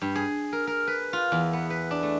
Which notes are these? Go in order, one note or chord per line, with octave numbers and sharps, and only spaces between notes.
G2
G#4
A#4
A#4
B4
F4
E2
B3
B4
D4
A3